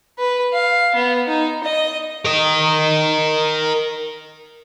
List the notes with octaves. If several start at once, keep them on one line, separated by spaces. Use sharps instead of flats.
B4
F5
B3
D#4
D#5
A#4 D#5